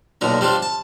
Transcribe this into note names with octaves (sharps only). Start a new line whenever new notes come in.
B1 A#2 D3 A#5
G3 C4 D4 F4
A5